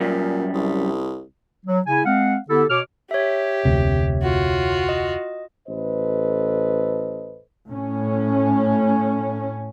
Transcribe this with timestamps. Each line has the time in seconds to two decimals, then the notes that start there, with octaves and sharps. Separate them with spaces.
0.01 F#2 A#2 G3
0.54 C2
1.66 F#3
1.86 C#3 E4 G#5
2.05 G#3 C4 F5 F#5
2.49 D3 B3 E4 G4 A4
2.69 B2 C#5 D6 F6
3.11 G4 C#5 E5
3.65 F1 D2 C3
4.22 F4 F#4
4.89 D#5
5.68 A1 A4 B4 C5 D#5
7.68 A2 C#4